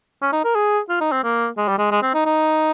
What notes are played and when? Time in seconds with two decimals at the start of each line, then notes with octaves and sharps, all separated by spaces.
0.22 C#4
0.33 D#4
0.44 A#4
0.55 G#4
0.89 F4
1.01 D#4
1.12 C4
1.24 A#3
1.58 G#3
1.68 G3
1.79 G#3
1.92 G#3
2.03 C4
2.14 D#4
2.26 D#4